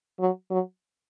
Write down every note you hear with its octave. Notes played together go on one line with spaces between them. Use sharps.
F#3
F#3